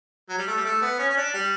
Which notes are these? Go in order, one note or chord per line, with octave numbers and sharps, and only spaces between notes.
F#3
G3
A3
G3
A3
B3
C#4
C#4
D4
G3